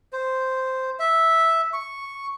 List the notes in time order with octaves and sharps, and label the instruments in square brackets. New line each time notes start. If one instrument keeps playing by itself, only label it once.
[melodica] C5
E5
C#6